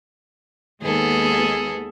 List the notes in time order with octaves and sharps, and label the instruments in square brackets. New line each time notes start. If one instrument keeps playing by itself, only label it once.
[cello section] D#2 G#3 B3 [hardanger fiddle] G#4 A4